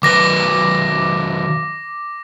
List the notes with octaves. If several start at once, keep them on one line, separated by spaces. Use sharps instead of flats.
D#3 F#3 B4 D6 A#6